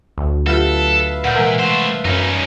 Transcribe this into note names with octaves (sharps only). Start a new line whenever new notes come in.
D2
F#3 F4 G4 A4 B4 E5 F5
A#2 F#5 F6 G6
C3 E3 G#3 A#4
A3 C5 F#5
F#2 C#4 D#4